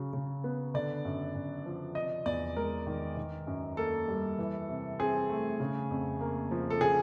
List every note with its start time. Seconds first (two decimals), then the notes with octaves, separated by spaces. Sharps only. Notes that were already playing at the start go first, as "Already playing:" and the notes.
Already playing: C#3 F#3
0.13 C#3
0.44 B3
0.74 D3 D5
1.05 F#2
1.35 F#2
1.66 F3
1.95 C3 D#5
2.26 E2 D5
2.56 G#3 A#4
2.87 D#3
3.17 D#3
3.47 F#2
3.77 A#3 A4
4.08 G3
4.39 E3
4.68 C3
4.99 C4 G#4
5.29 A3
5.60 C#3
5.91 F2
6.21 A#3
6.51 F3
6.70 A4
6.81 C#3 G#4